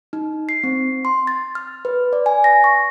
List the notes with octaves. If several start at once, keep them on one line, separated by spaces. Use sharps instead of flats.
D#4
C7
C4
C6
A6
F6
B4
D5
G#5
A#6
C#6